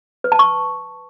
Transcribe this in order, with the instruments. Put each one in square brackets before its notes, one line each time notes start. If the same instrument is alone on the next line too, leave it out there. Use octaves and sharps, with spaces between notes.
[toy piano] B4
A5
C#6